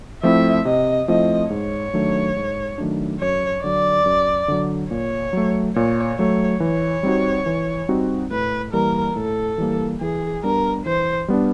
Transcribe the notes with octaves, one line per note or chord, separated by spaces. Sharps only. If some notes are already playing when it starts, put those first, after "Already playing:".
F3 A3 C4 E4 E5
C3 D#5
F3 A3 C4 E4 D#5
G#2 C#5
D#3 F#3 A3 D4
G#2
D#3 F#3 A3 D4
F#2 C#5
D3 F#3 D5
F#2
D3 F#3
A#2 C#5
F#3 A3
A#2 C#5
F#3 A3 C#5
E3 C#5
G3 C4 D#4 F#4
E3
G3 C4 D#4 F#4
A2 B4
E3 G3 A#3 A#4
A2 A4
E3 G3 A#3
E3 G#4
G3 B3 D4 A#4
E3 C5
G3 B3 D4